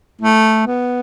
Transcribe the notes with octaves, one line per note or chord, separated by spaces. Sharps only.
A3
B3